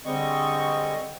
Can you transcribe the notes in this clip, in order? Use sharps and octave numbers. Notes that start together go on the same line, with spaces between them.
D3 G3 G#3 C4 D#5 C#6